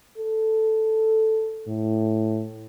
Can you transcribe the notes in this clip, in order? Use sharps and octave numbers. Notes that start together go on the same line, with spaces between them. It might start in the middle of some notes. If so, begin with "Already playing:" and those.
A4
A2